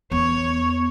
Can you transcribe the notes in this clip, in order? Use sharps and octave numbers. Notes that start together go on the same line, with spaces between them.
E2 B3 C#5